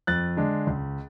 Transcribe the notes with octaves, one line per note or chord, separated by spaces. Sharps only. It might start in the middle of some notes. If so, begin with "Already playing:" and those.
F2 F#6 A6
D3 G#3 D4
C#2